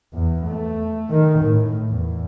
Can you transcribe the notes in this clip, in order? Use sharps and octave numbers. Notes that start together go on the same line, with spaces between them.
E2
A3
D#3
A2
E2